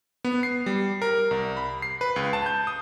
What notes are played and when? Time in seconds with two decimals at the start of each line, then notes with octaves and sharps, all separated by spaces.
0.24 B3
0.43 C7
0.66 G3
1.02 A#4
1.31 C2
1.57 B5
1.82 C7
2.01 B4
2.16 C#2
2.33 A5
2.46 G6
2.67 D#6